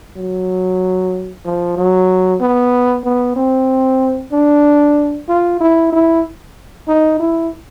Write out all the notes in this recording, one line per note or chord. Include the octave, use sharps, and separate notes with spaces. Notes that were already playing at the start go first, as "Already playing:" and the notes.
F#3
F3
F#3
B3
B3
C4
D4
F4
E4
E4
D#4
E4